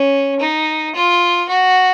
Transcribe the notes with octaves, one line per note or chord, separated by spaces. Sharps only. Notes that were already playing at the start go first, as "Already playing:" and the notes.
Already playing: C#4
D#4
F4
F#4